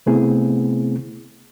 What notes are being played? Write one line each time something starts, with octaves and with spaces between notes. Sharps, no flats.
C3 A3 B3 C4 E4 G#4